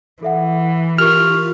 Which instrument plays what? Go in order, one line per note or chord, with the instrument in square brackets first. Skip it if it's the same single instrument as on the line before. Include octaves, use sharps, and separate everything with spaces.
[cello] E3 [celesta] A4 E5 F#5
[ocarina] F4 [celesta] G4 A#4 C#6 [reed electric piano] F6